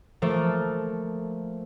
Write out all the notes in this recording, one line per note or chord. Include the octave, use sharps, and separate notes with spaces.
F3 A3 A#3